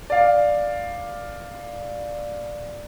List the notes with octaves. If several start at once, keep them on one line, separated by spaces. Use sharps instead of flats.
D5 F5